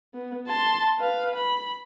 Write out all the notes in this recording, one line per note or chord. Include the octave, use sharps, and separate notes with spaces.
B3
A5 C6
B4 F5
B5